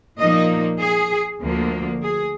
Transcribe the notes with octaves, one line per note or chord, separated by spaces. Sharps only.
A#2 F3 A#3 D#4 D#5
G#4
D2 D3 F3 A#3
G#4